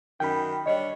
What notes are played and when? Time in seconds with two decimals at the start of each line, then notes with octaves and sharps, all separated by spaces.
0.20 F#2 D#3 G5 B5
0.66 G3 D4 C#5 D#5